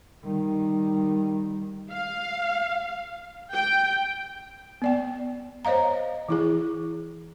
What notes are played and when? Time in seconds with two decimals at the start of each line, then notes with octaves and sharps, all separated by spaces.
0.23 D#3 G3
1.91 F5
3.52 G5
4.82 B3 D5 G5
5.65 C5 C#5 D#5 F5 A#5
6.29 E3 E4 G#4